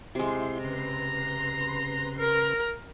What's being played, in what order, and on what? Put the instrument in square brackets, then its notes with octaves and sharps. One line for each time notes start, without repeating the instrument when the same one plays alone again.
[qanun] C3 G#3 [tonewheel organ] E4 C6
[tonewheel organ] C#3 B4 C6 [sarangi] A#5
[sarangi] A#4